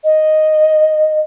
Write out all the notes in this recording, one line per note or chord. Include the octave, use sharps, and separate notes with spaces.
D#5